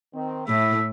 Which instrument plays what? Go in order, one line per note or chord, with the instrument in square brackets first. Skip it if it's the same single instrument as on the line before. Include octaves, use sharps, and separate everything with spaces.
[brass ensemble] D#3 C4
[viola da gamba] A2 [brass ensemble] A3 E4 [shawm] E5